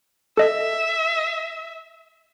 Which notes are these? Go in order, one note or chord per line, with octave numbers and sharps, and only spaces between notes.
A4 D#5 E5